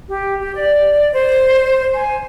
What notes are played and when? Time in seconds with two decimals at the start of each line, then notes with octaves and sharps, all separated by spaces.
0.08 G4
0.40 G4
0.54 D5
1.13 C5
1.94 G#5